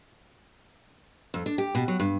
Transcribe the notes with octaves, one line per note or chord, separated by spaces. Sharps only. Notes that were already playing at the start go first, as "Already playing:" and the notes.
F2
D4
G4
B2
F#3
G2